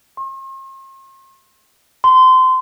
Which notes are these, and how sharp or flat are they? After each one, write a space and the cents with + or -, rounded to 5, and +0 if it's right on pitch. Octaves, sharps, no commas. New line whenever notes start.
C6 +45
C6 -25